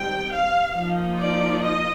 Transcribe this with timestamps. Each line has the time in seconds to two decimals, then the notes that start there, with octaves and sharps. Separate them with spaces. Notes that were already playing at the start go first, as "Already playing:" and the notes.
Already playing: D#3 G3 C4 D#4 G5
0.31 F5
0.75 F3 A#3 D#4
1.20 D5
1.64 D#5